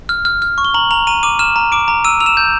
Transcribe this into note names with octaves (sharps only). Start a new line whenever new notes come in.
F6
F6
F6
C#6
G7
A#5 F#7
A#5 F7
A#5 D#7
D6 D#7
F6 E7
A#5
D6 D7
A#5
E6 D#7
E6 F7
E7
G6